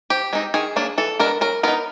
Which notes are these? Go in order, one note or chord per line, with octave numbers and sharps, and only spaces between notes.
F3 G4
G#3 C4 D#4
D#3 G#4
F#3 A#3 D4
E3 A4
G#3 B3 D4 A#4
F#3 A#4
B3 D#4 A#4